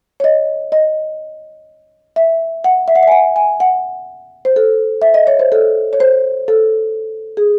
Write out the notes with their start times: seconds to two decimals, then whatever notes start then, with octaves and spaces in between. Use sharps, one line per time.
0.20 C#5
0.24 D#5
0.72 D#5
2.16 E5
2.64 F#5
2.88 E5
2.96 F#5
3.03 E5
3.08 G#5
3.12 F#5
3.36 G#5
3.60 F#5
4.45 C5
4.56 A4
5.02 E5
5.14 D#5
5.27 C#5
5.39 C5
5.52 A4
5.93 C#5
6.00 C5
6.48 A4
7.37 G#4